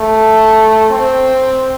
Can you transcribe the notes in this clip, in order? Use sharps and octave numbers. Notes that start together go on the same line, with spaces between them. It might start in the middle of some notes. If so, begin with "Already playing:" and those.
Already playing: A3
C4